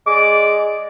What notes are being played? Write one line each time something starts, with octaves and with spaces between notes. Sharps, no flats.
G#3 D5 D6